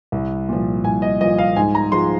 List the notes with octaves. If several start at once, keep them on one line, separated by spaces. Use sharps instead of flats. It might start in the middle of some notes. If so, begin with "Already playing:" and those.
C2
A#2 F3
C2 G#5
D#5
A#2 F3 D#5
F5
G#2 G#5
A#5
F3 G#3 C6